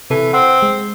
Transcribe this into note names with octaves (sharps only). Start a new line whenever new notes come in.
C3 E3 A4
C4 F#5 C6
G#3